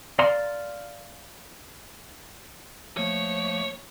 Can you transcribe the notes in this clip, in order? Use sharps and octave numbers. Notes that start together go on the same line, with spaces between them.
D5 F5 A#5 C6
F3 A3 A#3 C#5